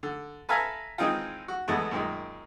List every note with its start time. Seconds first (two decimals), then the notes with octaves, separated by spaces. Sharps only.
0.03 D3
0.49 A4 B4 E5 F5 G#5 A#5
0.98 D#3 E3 G#3 C4 D#4 F4
1.48 F#4
1.68 E2 D3 G#3 A3 B3
1.91 F#2 A#2 D#3 G#3